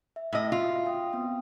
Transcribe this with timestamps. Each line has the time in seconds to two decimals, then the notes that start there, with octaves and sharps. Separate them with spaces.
0.16 E5
0.33 A2 D#5
0.52 F4 F#4 E5
0.85 F5 G5 D#6
1.13 B3 C4 G5